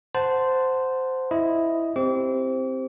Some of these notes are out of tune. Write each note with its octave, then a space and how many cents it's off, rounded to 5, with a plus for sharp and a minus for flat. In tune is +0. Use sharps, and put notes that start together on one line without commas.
C5 -10 F#5 +0 A5 +0
E4 +0 D#5 +0 B5 +0
C4 +0 G4 +0 D6 -40